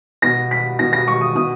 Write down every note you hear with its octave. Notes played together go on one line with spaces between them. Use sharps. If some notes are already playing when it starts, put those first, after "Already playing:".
B2 A#6
B6
B2 A#6
A#6
C#6
D#6
B2 D#6